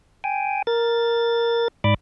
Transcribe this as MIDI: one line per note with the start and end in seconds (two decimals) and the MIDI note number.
0.24 0.62 79
0.24 0.62 80
0.67 1.68 70
0.67 1.68 93
1.84 1.94 44
1.84 1.94 74
1.84 1.94 83
1.84 1.94 86